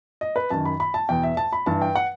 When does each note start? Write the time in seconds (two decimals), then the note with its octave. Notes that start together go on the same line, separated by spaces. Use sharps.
0.21 D#5
0.36 B4
0.50 F#2 D#3 A5
0.65 B5
0.80 B5
0.94 A5
1.09 E2 B2 G5
1.23 E5
1.37 A5
1.53 B5
1.66 G2 E3 A5
1.82 G5
1.95 F#5